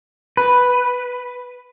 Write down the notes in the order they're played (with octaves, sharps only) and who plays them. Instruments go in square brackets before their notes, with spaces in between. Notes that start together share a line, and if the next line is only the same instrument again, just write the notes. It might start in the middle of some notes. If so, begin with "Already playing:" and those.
[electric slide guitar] B4